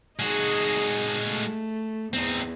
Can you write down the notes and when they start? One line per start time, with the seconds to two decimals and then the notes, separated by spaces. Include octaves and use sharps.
0.19 G#3 D#4 F#4 G#4
1.24 A3
2.13 E2 C4 D#4